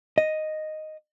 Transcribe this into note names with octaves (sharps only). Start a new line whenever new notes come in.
D#5